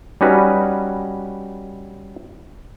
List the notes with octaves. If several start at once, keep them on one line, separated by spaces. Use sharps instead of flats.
G3 C#4 D#4 F#4 B4